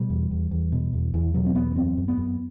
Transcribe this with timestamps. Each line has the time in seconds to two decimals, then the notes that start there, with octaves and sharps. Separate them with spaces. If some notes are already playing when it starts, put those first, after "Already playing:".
Already playing: B2 G3
0.10 E2
0.31 E2
0.51 E2
0.72 B2
0.93 E2
1.14 E2 E3
1.34 B2 F#3
1.46 C4
1.55 E2 B3
1.76 F#2 C4
1.97 F#2
2.08 B3
2.17 F#2